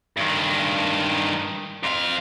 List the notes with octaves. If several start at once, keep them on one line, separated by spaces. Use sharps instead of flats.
G2 D#3
F2 F5